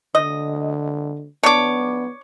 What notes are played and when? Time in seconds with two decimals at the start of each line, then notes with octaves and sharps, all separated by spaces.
0.15 D3 D#5
1.43 B3 D4 C#5 D6